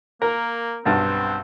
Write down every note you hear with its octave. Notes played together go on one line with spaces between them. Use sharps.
A#3 A#4
B1 G2 C4